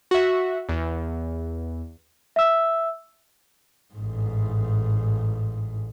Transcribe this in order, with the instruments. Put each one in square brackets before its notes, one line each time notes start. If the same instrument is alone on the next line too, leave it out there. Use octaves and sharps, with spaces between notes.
[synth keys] F#4 E5
E2
[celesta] E5 E6
[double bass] A1 G#2